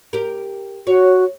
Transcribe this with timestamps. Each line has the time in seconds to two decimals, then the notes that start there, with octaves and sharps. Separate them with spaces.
0.13 G4 A#4
0.87 F#4 C#5